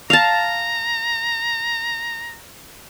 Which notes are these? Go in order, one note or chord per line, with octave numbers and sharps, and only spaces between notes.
F5 A5 A#5